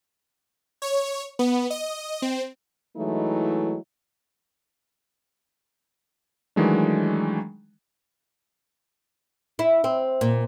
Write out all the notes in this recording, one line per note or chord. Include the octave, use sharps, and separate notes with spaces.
C#5
B3
D#5
C4
E3 F#3 G#3 A3 D#4 E4
D#3 E3 F#3 G#3 A3 D4
E4
C4
A#2